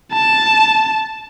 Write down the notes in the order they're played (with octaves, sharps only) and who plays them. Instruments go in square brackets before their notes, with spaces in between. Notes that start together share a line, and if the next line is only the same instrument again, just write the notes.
[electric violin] A5